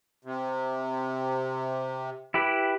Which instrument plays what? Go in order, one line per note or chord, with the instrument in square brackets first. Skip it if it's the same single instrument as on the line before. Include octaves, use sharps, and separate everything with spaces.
[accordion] C3
[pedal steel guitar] E4 G4 B4